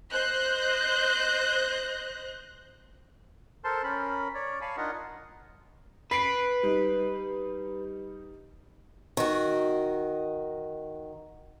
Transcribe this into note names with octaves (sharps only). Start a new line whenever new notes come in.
C5 D#5 F#6 G6 A#6
A4 A#4 C5 A5 C6
C#4 A#4 B5
C#5 D5
C#5 F5 G#5 A5 B5 C#6
D4 D#4 F4 A#4 D#5 F#5
B4 B6 C7 D7
G3 D#4
D#3 F#4